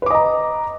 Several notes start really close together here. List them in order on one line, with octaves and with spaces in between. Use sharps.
B4 D6 D#5 A#5